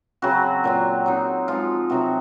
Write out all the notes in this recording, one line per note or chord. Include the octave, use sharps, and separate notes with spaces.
C#3 F#3 C4 F#4
A#2 F#3 C4
F#3 C4 D#4
F3 G#3 D#4 F4
C3 F#3 C4 D#4 F#4